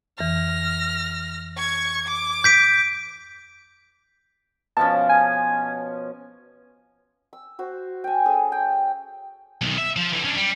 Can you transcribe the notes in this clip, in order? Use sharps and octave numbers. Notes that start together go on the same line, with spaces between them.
F2 E3 F6 A#6
C#6 G#6
D6
G6 B6 D7
B2 F3 C#4 A5
G#5
E6
F#4 C5
G5 G#5
C#4 G#4 A4
G5
B1 D#3
E5
F3
D3 E3
C#4 D4
G3